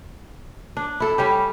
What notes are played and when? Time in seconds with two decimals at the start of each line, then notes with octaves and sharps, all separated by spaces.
0.77 D4
1.00 E4 A4
1.18 G3 C#4 G4